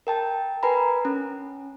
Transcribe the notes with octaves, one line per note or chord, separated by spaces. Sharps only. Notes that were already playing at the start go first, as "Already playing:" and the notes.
A#4 G5 A5
A#4 B4 G#5 A#5 B5
C#4